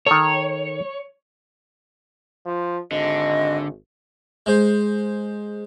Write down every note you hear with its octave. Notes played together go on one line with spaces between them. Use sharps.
D#3 A4 C#5
F3
G#1 D3 D#5
G#3 C5